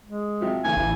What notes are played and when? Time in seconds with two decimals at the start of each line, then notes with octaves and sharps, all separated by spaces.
0.05 G#3
0.41 C3 F3 F#3
0.64 B1 E2 C#3 A3 G#5
0.77 A1 E4